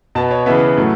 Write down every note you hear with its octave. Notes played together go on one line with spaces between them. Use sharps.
B2 B3 A5
C#5
C#3 E3 B3 E5
A2 F#3 A3